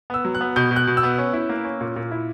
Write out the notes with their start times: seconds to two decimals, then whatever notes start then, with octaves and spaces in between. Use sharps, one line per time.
0.10 B3 E6
0.25 F#3
0.35 F#6
0.41 B3
0.56 B2 G6
0.71 B2
0.76 F#6
0.87 B2
0.97 E6
1.03 B3
1.18 C#4
1.33 E4
1.49 A#3
1.64 C#4
1.81 A#2
1.96 A#2
2.11 E4